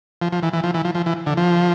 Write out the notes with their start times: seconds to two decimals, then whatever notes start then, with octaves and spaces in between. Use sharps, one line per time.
0.22 F3
0.32 F3
0.43 E3
0.53 E3
0.64 F3
0.74 E3
0.85 F3
0.95 F3
1.06 E3
1.26 D3
1.37 F3